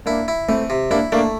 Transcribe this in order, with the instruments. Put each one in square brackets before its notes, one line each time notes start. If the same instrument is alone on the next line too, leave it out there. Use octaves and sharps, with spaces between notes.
[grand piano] A#3 D4 [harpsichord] E4
[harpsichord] E4
[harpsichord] E3 [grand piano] A3 C4
[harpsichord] C3
[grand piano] A#3 D4 [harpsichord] E4
[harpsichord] A3 [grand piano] A#3 D4